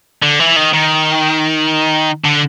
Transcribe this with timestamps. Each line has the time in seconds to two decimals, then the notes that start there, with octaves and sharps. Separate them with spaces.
0.23 D3
0.40 E3
0.56 D#3
0.73 D#3
2.24 D3